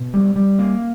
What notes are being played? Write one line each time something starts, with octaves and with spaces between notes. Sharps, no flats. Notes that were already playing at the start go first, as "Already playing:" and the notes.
Already playing: B2
G3
G3
A#3